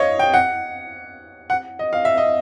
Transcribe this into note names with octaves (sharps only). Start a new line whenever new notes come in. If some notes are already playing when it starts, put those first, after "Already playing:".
Already playing: C#5 D#5 F5
G5
F#5
F#5
D#5
F5
E5
D#5